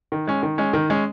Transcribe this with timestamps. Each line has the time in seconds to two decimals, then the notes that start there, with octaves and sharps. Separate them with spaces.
0.12 D#3
0.27 G#3 C#4
0.43 D#3
0.58 G#3 C#4
0.73 D#3
0.90 G#3 C#4